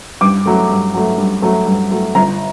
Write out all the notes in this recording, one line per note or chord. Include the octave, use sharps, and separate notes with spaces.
G2 D6
F#3 A3
G2
F#3 A3
G2
F#3 A3
G2
F#3 A3
G1 A#5